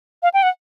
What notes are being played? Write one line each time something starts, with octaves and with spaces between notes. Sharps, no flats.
F5
G5
F#5